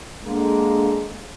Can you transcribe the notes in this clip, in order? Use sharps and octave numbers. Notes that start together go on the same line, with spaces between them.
D3 G#3 A#3